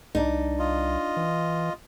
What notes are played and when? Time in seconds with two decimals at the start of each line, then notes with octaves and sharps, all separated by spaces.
0.15 C2 D4 D#4
0.59 F4 D#5
1.17 E3